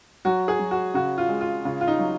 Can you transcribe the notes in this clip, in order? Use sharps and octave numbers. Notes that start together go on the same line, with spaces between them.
F#3 F#4
G#4
F#3
F#4
C#3 F#4
F4
G#3
F4
C#3 F4
F4
D#4
F#3